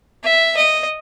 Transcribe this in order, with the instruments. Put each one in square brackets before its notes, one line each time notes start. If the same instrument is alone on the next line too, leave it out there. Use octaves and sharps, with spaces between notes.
[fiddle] E5
D#5